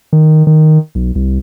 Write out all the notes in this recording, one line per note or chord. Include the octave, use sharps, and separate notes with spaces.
D#3
D#3
B1
C2